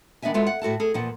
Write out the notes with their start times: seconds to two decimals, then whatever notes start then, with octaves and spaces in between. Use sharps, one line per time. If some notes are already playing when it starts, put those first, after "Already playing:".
0.22 D#3 B3 D4 D#5 E5 G#5
0.34 G#3 B3 F4 F#4 A4 E5
0.46 F#5
0.62 A2 F#4 A4 A5
0.80 G#4 A4
0.94 E2 A#2 F3 F#5